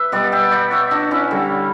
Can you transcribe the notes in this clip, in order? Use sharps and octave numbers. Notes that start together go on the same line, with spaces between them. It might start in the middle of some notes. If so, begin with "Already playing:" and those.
Already playing: B4 E5
B2 G3 D5 F#5
E5 G5
D5 F#5
C#5 E5
D4 F#4
C#4 E4
D3 G3